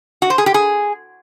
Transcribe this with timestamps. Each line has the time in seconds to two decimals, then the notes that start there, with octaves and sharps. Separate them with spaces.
0.22 F#4
0.30 C5
0.38 G#4
0.46 G4
0.54 G#4